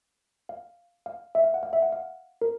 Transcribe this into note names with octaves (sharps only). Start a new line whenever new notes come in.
F5
F5
E5
F5
F#5
F5
E5
F#5
F5
A#4